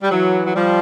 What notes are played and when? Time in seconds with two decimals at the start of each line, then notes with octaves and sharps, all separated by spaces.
0.02 G3
0.11 E3 F#3
0.46 F#3
0.55 F3 G3